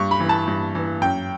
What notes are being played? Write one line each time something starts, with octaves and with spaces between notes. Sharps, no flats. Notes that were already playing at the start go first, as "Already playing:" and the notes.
Already playing: G2 C#6
B5
E3
A5
G2
E3
F#2 G5